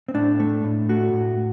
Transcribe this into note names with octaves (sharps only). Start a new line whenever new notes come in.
C4
A2 D4
A3
A2
A3 F#4
A2